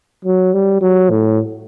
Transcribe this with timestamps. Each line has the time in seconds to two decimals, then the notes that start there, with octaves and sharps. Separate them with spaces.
0.25 F#3
0.53 G3
0.81 F#3
1.10 A2